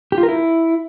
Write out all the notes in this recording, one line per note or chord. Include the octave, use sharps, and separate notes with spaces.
G4
F4
A#4
E4